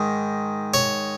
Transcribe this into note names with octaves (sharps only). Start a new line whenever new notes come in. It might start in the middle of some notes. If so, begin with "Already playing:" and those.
Already playing: G#2 D#3
C#5